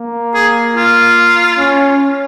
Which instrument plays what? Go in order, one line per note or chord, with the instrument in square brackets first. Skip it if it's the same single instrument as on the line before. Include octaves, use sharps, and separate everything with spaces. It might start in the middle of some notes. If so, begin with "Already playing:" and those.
Already playing: [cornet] A#3
[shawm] G#4
F4
[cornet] C#4